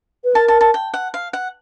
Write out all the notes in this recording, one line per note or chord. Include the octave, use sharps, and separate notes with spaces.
B4
A#4 A5
A5
A5
G5
F#5
F5
F#5